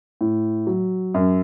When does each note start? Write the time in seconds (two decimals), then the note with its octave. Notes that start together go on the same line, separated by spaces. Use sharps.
0.21 A2
0.67 F#3
1.14 F#2